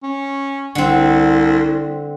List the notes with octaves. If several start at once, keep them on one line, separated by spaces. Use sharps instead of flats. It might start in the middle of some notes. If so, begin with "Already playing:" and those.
C#4
C2 D3 C4